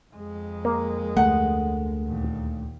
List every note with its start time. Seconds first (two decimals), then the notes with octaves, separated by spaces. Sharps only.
0.12 F2 G#3
0.65 A#3
1.16 D2 A3 F#5
2.04 D#2 A#2